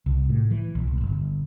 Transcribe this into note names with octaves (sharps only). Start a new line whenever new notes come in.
C2
A2
E3
A#1
B1
G1